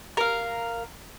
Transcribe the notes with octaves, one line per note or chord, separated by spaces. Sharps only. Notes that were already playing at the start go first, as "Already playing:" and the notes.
A#4 F5